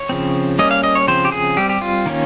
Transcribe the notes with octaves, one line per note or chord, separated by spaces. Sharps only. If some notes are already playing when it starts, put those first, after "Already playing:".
Already playing: C#5
C#3 F3 C4
G3 A#3 C#4 D#5
F5
D#5
C#5
C#3 F3 C4 C5
G4
G#4
G3 C4 G4
G4
F4
D#3 A#3 C#4